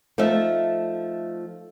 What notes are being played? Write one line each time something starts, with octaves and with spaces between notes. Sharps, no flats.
F3 A3 D#4 A4 E5